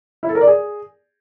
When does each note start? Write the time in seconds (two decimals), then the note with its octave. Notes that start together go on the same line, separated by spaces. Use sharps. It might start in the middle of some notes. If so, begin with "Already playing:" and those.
0.23 E4
0.29 A4
0.35 A#4
0.41 D5
0.47 G#4